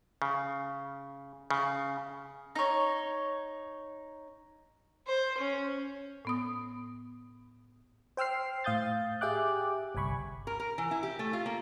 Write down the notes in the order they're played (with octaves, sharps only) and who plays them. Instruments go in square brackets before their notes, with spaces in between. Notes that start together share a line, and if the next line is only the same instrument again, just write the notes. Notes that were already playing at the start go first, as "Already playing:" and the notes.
[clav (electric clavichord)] C#3
C#3
[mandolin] D#4 C#5
[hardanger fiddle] C5
C#4
[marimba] A2 B3 D#6
[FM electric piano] C5 G5 E6 F6 C7
A2 F5 D#6 G6 A6
G4 G#4 E5 G5 D6 F#6
G1 C2 G#5 B5 C#6
[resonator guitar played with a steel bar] A#4
A#4
E3
E4
G4
A3
F4
A#3